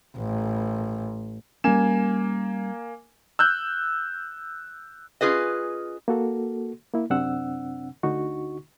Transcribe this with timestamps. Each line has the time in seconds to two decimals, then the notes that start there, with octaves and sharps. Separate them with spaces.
0.17 A1
1.64 G3 A#3 C#4 G#5 E7
3.39 E6 F#6 G6
5.21 C#4 F4 G#4 B4 D#5
6.08 A#3 F#4 A4
6.94 A#3 E4
7.10 F#2 C3 C4 D4 F#5 E6
8.03 D2 D3 D#4 F#4 C#6